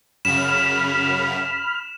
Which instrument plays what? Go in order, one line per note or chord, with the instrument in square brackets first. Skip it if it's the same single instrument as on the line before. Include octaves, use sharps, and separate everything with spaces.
[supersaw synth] F#2 C#3 [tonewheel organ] B5 F6 [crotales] E7